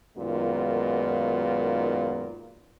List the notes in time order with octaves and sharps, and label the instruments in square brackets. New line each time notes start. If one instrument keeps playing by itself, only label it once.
[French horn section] F#2 A#2 D#3 G#3 B3 F4